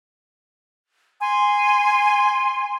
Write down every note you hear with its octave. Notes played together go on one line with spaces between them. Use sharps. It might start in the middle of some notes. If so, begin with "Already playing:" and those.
G#5 C6